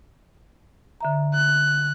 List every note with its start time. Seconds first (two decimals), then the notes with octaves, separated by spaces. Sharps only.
1.01 D3 E5 A#5
1.34 F#6